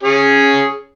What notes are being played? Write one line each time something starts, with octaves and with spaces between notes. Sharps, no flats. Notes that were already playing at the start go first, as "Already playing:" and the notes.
C#4 G#4